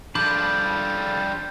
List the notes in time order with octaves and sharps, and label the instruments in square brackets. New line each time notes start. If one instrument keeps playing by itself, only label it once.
[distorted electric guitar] F3 G3 [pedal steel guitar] D4 B5 D6 [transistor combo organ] A4 F5 [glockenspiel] G6